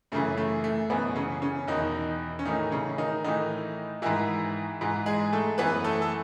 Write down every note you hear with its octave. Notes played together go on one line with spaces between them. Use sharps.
F#2 C#3 E3 A3
A3
A3
F#2 B2 E3 B3
C#3 C#4
C#3 C#4
E2 B2 D#3 D#4
C#4
A2 D#3 E3 D#4
C#3 C#4
D#3 D#4
A2 D#3 E3 D#4
G#2 D#3 E3 E4
G#2 E3
G#3 G#4
A3 A4
F#2 E3 B3 B4
A3 A4
A4